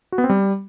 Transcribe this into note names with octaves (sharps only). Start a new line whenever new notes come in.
F#4
B3
C4
G3